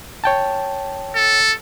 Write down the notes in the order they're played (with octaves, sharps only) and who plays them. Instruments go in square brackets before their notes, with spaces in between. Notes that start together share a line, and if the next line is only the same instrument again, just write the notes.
[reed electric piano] C#5 G5 A5
[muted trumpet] A4